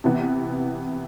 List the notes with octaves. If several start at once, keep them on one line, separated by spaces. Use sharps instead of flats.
C3 E3 B3